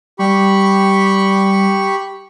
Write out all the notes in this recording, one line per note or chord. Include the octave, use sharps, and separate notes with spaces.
G3 G4 B5 C#6